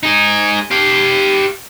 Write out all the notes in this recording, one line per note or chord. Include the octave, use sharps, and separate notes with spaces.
D#4 G#4
G4 F5